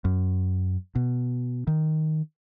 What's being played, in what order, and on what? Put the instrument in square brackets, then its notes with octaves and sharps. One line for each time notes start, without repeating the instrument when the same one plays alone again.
[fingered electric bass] F#2
B2
D#3